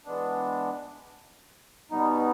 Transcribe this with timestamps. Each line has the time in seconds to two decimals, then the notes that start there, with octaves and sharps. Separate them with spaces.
0.05 E3 G#3 B3 D4
1.91 B2 G3 B3 D#4